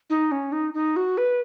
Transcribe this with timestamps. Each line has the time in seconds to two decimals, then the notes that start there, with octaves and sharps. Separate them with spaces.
0.10 D#4
0.32 C#4
0.52 D#4
0.74 D#4
0.96 F#4
1.18 B4